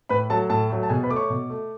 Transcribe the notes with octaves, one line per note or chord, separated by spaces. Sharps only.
A2 B4 B5
F#3 A3 A4 A5
A2 A4 A5
F#3 A3
A5
B2 G#4 G#5
B4 B5
A3 D6
C#5 C#6
B2
A3